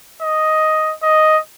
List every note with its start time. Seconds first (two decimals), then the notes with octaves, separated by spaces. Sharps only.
0.22 D#5
1.03 D#5